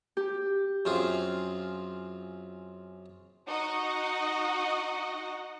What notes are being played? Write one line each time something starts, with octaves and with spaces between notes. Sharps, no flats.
G4
F#2 C4 F4 G#4
D#4 F#4 D#5 F#5